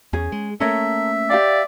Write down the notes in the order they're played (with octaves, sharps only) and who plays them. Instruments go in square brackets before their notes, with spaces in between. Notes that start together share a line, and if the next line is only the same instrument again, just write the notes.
[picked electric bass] E2 [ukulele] C#4 G#4
[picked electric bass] G#3
[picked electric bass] A3 A#3 C#4 [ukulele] A4 A#4 C#5 [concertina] E5
[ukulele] G4 F5 G5 [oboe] D5